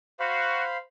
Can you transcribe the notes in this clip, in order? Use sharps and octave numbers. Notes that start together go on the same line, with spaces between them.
F#4 C5 F5 B5